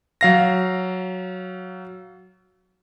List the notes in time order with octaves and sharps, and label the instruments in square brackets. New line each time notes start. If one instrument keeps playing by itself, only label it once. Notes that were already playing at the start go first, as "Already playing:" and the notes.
[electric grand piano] F#3 F5 A#6